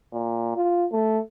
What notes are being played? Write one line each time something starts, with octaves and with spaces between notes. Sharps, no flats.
A#2
F4
A3